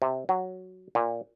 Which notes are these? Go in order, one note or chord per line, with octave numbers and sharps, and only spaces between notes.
C3
F#3
A#2